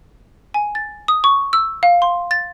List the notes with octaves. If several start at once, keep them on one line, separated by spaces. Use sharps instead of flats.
G#5
A6
D#6
C#6
E6
F5
C6
A6